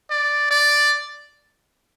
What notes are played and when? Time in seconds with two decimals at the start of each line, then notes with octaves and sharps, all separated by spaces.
0.10 D5
0.51 D5